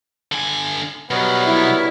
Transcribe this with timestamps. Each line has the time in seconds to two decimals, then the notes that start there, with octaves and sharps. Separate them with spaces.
0.32 D3 G#5
1.11 B2 F#3 G3 B3 A#4 C#5
1.45 E4